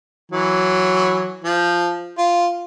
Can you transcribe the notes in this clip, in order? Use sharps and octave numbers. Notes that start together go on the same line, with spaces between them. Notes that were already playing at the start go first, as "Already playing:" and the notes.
E3 F#3
F3
F4